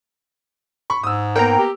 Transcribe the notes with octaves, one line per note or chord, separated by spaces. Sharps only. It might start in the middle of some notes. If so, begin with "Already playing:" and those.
B5 C#6
G#2 D#6 E6
A#3 B3 A#4 G5 A#5
G4